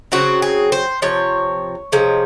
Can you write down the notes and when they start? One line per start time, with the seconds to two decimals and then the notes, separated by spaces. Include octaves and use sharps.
0.12 C#3 F#3 C4 F#4
0.42 G#4
0.72 C5
1.02 C3 F3 C#5
1.92 C3 F3 G#3 C#4